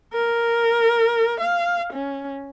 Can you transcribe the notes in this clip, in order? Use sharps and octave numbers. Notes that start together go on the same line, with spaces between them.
A#4
F5
C#4